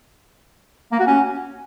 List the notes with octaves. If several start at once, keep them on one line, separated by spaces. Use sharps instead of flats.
A#3
F#4
C#4